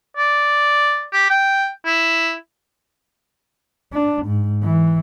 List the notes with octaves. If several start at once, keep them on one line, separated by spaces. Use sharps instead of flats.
D5
G4
G5
E4
D4
G#2
E3